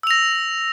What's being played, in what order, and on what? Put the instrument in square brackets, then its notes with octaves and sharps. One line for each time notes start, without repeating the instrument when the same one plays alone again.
[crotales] E6
F7
A#6